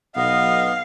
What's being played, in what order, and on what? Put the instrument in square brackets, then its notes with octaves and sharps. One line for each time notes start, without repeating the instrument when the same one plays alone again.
[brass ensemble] B1 D#5 [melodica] B3 [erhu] F5